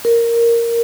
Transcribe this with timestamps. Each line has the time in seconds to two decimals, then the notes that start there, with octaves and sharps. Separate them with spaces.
0.05 A#4